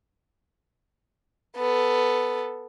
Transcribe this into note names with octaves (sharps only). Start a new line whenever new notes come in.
B3 A4